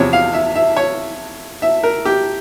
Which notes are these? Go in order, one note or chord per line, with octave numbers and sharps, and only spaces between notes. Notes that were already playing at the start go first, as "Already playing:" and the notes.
Already playing: E2 C3 F3 C#5
F5
E5
E5
C#5
E5
A#4
G4